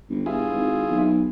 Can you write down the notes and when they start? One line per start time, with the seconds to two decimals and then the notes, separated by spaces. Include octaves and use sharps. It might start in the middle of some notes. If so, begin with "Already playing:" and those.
0.10 G1
0.26 G2 E4 F4 G#4
0.54 G#1
0.89 B1